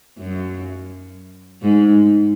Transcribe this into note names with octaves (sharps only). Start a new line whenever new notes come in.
F#2
G#2